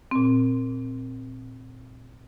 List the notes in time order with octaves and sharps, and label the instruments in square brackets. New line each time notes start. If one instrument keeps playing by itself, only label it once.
[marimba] A#2 C4